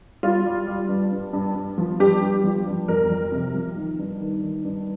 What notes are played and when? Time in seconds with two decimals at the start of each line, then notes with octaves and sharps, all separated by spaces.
0.23 G3 F4
0.45 G3
0.67 G3
0.89 G2
1.12 G2
1.33 G2
1.55 G2
1.78 F3
2.00 G2 G4
2.21 G2
2.44 F3
2.67 G2
2.88 F2 A#4
3.10 F2
3.32 C3
3.54 F3
3.76 D#3
3.99 G2
4.20 D#3
4.42 D#3
4.65 G2